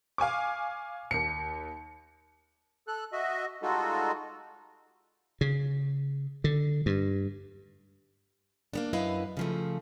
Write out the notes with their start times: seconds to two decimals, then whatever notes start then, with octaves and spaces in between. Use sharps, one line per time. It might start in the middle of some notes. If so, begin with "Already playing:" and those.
0.18 F5 G#5 C#6 D6
1.11 D#2 C#7
2.88 A4 F#6
3.13 F#4 D#5 E5
3.62 G3 G#3 D#4 F4 F#4 A4
5.41 C#3
6.44 D3
6.86 G2
8.73 A#3 B3 D4
8.93 F#2 E4 B4 D#5 F5
9.37 C#3 F3 A3